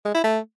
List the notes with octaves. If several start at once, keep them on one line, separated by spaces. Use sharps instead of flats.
G#3
E4
A3